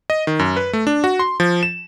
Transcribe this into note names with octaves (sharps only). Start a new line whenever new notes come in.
D#5
D#3
F#2
B4
A3
D4
F#4
C6
F3
E7